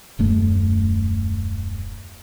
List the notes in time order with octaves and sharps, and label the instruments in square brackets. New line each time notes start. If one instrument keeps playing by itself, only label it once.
[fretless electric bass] D#1 F#2 A3